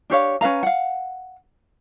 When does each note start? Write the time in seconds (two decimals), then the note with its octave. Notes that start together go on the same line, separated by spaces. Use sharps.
0.10 D4 G4 C#5 F5
0.41 C#4 B4 F5 A#5
0.63 F5 F#5